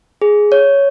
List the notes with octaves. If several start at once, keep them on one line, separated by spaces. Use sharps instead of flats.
G#4
C#5